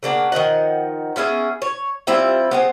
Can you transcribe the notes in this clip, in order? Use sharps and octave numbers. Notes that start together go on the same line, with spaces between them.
C#3 A#3 D4 F#5
D#3 F3 D#5 F#5
B3 C#4 E4 G#4
C#5
G3 C4 E4 F4
B3 C4 G#4